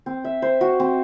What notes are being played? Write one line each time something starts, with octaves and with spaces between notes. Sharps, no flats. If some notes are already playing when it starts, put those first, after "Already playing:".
C4
E5
C5
F#4
C4